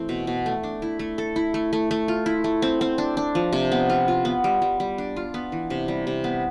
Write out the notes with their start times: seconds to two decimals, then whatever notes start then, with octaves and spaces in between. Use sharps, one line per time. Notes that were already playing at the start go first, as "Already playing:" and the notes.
Already playing: E3 A3 C4
0.09 B2
0.27 B2
0.46 A3
0.63 D4
0.82 E4
0.99 A3
1.18 A4
1.36 E4
1.54 A3
1.73 A3
1.91 A3
2.08 F4
2.26 E4
2.44 A3
2.62 C4
2.81 C4
2.98 D4
3.17 D4
3.35 F3
3.53 C3
3.71 B3
3.90 F4
4.08 F4
4.25 B3
4.44 G3
4.62 G3
4.80 G3
4.98 D4
5.16 F4
5.34 B3
5.52 E3
5.70 C3
5.88 G3
6.07 C3
6.24 B3